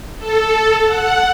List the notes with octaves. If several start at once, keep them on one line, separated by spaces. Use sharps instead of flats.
A4
F#5